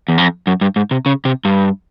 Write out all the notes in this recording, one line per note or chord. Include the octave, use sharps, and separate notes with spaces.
E2
F2
F#2
G2
G#2
C3
C#3
C3
G2